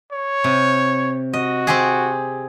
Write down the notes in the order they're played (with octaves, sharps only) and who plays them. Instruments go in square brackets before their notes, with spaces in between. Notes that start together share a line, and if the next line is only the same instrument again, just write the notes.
[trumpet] C#5
[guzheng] C3
[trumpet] F#4 [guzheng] D#5
[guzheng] C4 G4 G#4